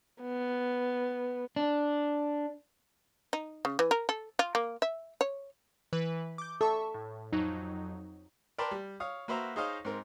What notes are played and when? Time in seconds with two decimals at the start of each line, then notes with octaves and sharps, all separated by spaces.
0.21 B3
1.56 D4
3.33 D#4
3.65 C#3
3.79 E3
3.91 A#4
4.09 A4
4.39 F4
4.55 A#3
4.82 E5
5.21 C#5
5.93 E3 B4
6.38 D6 G6
6.61 A4 E5 C#6
6.94 A2
7.32 F2 F#3 D#4
8.58 A#4 B4 D5 G5 A5 C6
8.71 G3
9.00 C#5 F5 D#6
9.28 A#3 F#4 B4 C5 E5 A#5
9.56 D#4 G#4 C5 C#5 D#5 F5
9.85 G#2 C4 A#4